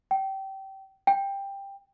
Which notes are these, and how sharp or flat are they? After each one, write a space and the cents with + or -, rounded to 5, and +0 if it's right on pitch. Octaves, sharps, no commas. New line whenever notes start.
G5 -25
G5 +15